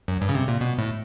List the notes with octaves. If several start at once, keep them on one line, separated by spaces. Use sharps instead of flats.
F#2
G2
C#3
C3
A#2
B2
A2